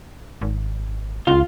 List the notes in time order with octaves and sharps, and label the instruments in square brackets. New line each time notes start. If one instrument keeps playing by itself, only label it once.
[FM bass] G#1
[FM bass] C#2 [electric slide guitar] F4